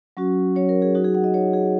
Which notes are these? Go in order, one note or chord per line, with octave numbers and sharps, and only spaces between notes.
F#3 C#4 F#4
F#3 C#4 F#4 C#5
A#4
G#4
F#3 D#4 F#4
G#4
F#5
D#5
F#3 D#4 F#4 C#5
G#4